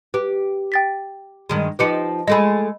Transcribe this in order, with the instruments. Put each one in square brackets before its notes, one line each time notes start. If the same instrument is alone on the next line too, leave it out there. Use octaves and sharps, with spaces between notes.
[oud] G4 [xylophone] B4
[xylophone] G5 A6 B6
[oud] G2 D#3 G#3
[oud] F3 D#4 G4 [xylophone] B4 C#7
[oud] G#3 A3 G#4 [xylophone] D#5 B5